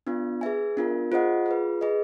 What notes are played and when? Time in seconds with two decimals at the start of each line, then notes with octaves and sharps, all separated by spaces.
0.07 B3 D4 F4
0.41 G#4 B4 E5 G#5
0.77 B3 D4 F4 A#4
1.12 F4 G#4 C5 D#5 F#5
1.46 F4 G#4 B4
1.81 G#4 B4 D#5